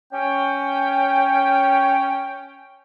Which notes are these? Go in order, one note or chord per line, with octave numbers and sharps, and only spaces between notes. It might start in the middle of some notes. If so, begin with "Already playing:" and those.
C#4 G5